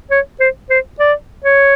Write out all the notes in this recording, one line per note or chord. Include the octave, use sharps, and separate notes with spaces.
C#5
C5
C5
D5
C#5